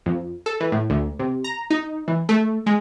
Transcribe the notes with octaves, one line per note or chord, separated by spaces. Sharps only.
F2
A4
E3
A2
D2
C3
A#5
D#4
E3
A3
G#3